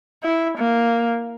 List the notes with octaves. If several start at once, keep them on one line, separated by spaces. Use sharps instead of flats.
E4
A#3